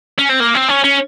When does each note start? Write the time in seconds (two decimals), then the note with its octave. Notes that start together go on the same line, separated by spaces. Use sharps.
0.19 C#4
0.30 C4
0.41 A#3
0.55 C4
0.69 C#4
0.84 C#4